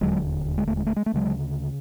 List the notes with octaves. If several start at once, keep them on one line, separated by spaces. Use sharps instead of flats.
E1 D#2 D3 F#3 G#3
G#3
A3
G#3
A3
G#3
A3
D2 C#3 F#3 G#3